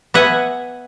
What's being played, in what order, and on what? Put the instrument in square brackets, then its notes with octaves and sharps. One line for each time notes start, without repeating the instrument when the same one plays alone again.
[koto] B3 E5 F#5 G#5